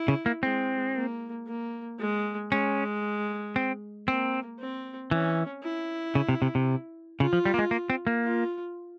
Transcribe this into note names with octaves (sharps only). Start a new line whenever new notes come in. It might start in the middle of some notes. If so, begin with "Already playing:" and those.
Already playing: E4
C#3
A#3
G#3 C4
A#3
A#3
G#3
G#3 C#4
C4
A#3 C4
C4
E3 C#4
E4
C#3
C3
C3
C3
C#3 F4
F3
G3
A#3
G#3
A#3
C4
A#3
F4